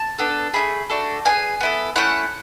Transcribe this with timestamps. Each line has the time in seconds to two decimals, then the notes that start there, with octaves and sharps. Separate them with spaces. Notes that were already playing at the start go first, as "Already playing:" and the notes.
Already playing: A5
0.18 B3 D4 A4
0.54 A3 E4 G#4 B5
0.90 A3 D4 F#4 A4
1.25 B3 D4 G#4 G#5
1.61 B3 E4 A4
1.96 A3 C#4 E4 F#5